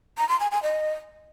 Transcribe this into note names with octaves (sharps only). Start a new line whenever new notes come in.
A#5
C6
G#5
G#5
D#5